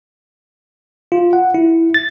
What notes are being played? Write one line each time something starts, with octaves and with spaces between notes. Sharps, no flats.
F4
F#5
E4
A6